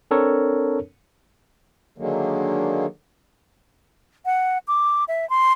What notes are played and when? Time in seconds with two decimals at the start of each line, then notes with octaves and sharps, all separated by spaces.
0.11 C4 D4 A4 A#4 C#5
1.98 D3 D#3 F#3 G#3 A#3
4.25 F#5
4.68 D6
5.08 E5
5.30 C6